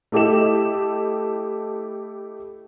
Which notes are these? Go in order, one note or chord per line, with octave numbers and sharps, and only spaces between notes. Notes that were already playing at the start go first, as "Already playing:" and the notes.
A3 E4 G4 A4 D#5 E7